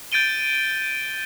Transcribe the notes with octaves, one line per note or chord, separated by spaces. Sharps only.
G6 A6 D7 D#7 G7